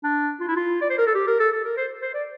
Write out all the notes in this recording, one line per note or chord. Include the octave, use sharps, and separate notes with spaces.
D4
F4
E4
F4
D5
C5
A#4
A4
G4
A#4
A4
A4
A#4
C5
C5
D5